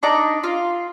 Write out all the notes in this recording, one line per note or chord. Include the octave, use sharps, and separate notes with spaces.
D4 D#4 D5 A#5
F4